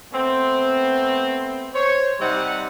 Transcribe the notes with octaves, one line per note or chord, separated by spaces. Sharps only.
A3 B3 C4
C5 C#5
C3 G3 C4 D#4 F#5